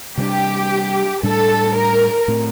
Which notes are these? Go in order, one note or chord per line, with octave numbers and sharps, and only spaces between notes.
C3 G3 A#3 D4 G4
A2 G3 D4 A4
A#4
A2 A3 C4